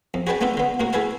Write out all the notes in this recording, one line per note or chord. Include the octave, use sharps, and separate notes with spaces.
F2
F#4 G#4 B4 D5 G5 A5
A3 B3 D4 F4 A4
D3 B3
A2 A#3 F#4
A3 E4 G#4 B4 F5 A5